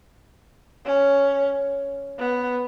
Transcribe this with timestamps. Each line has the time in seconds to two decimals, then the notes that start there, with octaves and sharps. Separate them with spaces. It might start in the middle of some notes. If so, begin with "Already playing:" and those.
0.85 C#4
2.18 B3